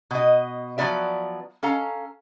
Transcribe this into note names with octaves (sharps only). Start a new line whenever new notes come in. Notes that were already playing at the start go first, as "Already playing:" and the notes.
B2 D#5
F3 F#3 B3 D5 E5
C#4 A4 F5 A#5